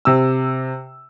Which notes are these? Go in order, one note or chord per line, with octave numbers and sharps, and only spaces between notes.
C3 E6